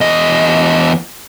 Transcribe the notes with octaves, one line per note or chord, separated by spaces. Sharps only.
E2 D#5